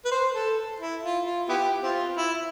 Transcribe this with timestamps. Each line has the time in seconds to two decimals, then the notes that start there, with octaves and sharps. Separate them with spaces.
0.05 B4
0.12 C5
0.35 A4
0.80 E4
1.03 F4
1.25 F4
1.49 B3 E4 G4
1.83 C4 F4
2.17 E4